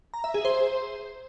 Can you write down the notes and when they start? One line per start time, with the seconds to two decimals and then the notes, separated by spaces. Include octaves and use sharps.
0.14 A#5
0.24 E5
0.34 G#4
0.45 C5